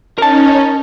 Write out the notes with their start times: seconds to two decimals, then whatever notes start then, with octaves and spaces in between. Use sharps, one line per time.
0.18 C#4 D#4 A#4 A5